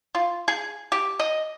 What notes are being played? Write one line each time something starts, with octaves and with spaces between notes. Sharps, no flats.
F4
G#4
G4
D#5